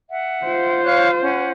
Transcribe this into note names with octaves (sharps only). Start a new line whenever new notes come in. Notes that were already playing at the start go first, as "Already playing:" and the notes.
E5 F#5
F4 C5
C#5 F5 F#6
C#4 F#5